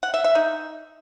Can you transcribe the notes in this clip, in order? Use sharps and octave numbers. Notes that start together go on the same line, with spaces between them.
F#5
E5
E5
D#4